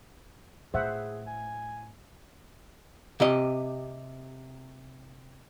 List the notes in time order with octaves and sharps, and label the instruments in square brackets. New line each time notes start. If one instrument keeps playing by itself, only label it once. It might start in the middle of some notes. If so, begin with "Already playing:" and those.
[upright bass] A2 [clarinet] G#4 [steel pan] C5 E5 F#5
[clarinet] G#5
[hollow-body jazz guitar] C3 G4 D#5